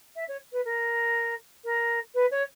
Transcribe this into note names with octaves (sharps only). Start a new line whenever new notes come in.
E5
C#5
B4
A#4
A#4
B4
C#5